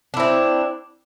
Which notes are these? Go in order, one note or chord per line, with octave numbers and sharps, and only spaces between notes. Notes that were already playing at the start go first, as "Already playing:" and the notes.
C4 D4 E4